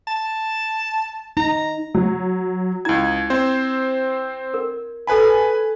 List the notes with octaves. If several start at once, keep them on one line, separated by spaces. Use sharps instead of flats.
A5
D#4 A#5
F#3
C#2 E4 A#5 G#6
C4 C5
A#4
A4 B4 G#5 A5 B5